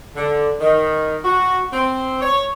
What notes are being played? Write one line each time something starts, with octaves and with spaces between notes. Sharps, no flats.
D3
D#3
F#4
C4
C#5